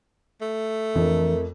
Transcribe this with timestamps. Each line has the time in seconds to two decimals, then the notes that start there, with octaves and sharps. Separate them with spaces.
0.41 A3
0.96 F2 E3 D4 A#4